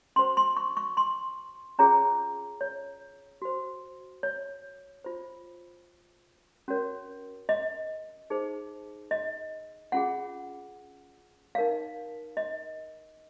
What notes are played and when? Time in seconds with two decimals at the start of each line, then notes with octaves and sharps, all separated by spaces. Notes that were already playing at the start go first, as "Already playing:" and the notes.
0.16 C#4 F#4 C5 C6
0.37 C6
0.57 C#6
0.77 C#6
0.97 C6
1.79 C#4 F4 G#4 C#5 A#5
2.61 C#5
3.42 F#4 C5
4.23 C#5
5.04 F4 C5
6.68 C#4 F#4 A#4 C#5
7.49 D#5
8.30 D#4 G#4 C5
9.11 D#5
9.92 C#4 F4 G#4 F#5
11.55 D#4 A#4 C#5 F5
12.37 D#5